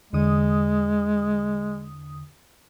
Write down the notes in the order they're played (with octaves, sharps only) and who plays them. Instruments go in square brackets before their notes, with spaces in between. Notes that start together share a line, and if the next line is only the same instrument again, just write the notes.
[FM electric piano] E2 D3 D#6 [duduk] G#3